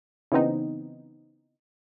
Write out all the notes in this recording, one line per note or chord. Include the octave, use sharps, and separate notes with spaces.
C#3 E3 B3 C4 D#4